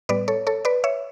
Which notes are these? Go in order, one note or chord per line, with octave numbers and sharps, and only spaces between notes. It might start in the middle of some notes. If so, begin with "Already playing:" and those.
A2 G3 B3 B4 D5
A4 C#5
A4 C#5
B4 D5
C#5 E5